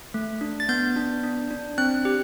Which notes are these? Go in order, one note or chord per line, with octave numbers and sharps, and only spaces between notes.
A3
D4
A6
B3 G6
D4
D4
D4
C4 F#6
G4